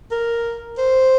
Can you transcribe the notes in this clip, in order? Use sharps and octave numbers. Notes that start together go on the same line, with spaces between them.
A#4
C5